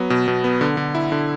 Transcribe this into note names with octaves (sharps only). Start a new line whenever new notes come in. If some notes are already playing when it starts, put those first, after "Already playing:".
Already playing: F#3 B3
B2
B2
B3
D3
D3
E4
D3